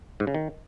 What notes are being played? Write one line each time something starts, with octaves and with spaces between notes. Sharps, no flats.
G#2
C#3
D#3